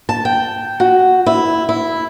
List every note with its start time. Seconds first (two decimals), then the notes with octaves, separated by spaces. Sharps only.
0.09 A5
0.25 G5
0.80 F#4
1.26 E4
1.69 E4